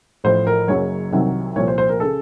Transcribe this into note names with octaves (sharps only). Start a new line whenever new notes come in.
A1 A2 F3 C5
A#4
F#1 F#2 C#3 F#3 C#5
C2 C3 D#3 F#3
C2 A#2 F3 C#5
C5
C5
A#4
C#3 A4